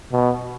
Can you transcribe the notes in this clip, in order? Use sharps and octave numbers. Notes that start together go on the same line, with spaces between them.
B2